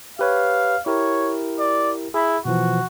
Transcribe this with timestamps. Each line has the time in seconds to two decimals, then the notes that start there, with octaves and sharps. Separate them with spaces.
0.19 G4 B4 C#5 F5
0.86 E4 G4 A#4 C#5
1.59 D5
2.14 E4 G#4 B5
2.45 B2 E3 F3 F#4